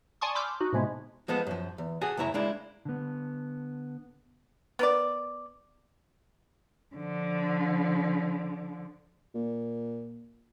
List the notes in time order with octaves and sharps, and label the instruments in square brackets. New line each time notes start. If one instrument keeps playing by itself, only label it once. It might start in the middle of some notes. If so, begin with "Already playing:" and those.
[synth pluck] D5 G#5 A5 C6 C#6 D#6
B5 C6 D6 E6 F6 G6
D#4 F#4
A2 C3 G#3 B3
[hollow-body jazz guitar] F3 G#3 B3 A4
F#2 F3
E2
F#4 G#4 A4
C#2 F#2 E4 C#5 A#5
G#3 A#3 D4 E4
[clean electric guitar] D3 B3
[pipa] B3 A#4 D5
[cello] D3 F3
[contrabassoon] A#2